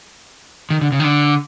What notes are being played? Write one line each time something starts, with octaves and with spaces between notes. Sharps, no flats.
D#3
D3
C#3
D#3
D3